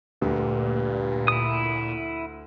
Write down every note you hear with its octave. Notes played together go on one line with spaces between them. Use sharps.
D2 G2 A#2
E4 D#6